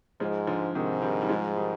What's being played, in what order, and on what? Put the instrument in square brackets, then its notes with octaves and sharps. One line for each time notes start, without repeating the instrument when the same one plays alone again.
[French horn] G#2 [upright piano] F3 G#3
[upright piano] D3 F3
[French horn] G#2 [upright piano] C3 D#3
[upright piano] D#3 G3
G3
F3 G#3
D#3 G3